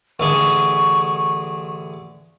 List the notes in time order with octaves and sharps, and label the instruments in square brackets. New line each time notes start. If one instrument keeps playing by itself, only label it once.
[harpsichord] A1 D3 G#4 [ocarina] C#6